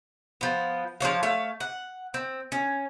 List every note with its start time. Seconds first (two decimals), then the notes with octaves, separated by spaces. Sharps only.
0.41 F3 B3
1.01 F3 D4 C#5 F5
1.23 A3 C#5 F5
1.60 F#5
2.14 C4
2.52 C#4